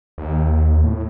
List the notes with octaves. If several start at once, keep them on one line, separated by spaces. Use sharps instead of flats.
D#2
A2